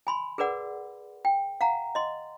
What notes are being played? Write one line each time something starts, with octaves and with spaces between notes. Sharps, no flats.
G#5 B5 C6
G#4 A#4 B4 D5 F#5
G5
F5 F#5 A#5
D#5 C6